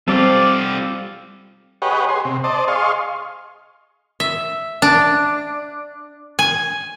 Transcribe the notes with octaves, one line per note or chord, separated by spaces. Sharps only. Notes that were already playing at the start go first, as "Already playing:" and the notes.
G3 C4 F4 G4 A4 D5 F5
G4 G#4 B4 C#5 D#5 F#5
G#4 C6
C3
C5 D5 D#5 A5
G#4 D#5 F5 C6 C#6
E5
D4
G#5